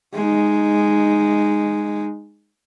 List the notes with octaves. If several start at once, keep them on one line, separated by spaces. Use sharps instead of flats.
G#3 D#4